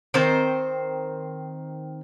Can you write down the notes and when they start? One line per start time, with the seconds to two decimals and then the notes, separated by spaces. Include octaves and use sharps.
0.14 D#3 C4 C5